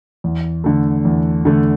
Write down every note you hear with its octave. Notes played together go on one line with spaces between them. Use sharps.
E2
D3 A3
E2
D3 A3